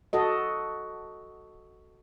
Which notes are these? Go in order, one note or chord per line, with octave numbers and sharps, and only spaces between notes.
F#4 A4 D#5